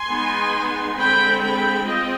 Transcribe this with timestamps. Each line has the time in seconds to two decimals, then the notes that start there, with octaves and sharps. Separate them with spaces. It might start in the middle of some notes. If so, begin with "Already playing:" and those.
Already playing: G#5 C6
0.08 G#3 B3 D#4
0.97 D3 G#3 C4 G5 B5
1.42 G5 B5
1.86 G#3 C4 F4 D#5 G5